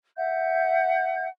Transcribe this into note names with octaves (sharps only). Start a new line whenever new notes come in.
E5 F#5 G6